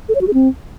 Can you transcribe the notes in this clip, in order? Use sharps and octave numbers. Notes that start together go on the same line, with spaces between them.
A4
C#5
F#4
G#4
C4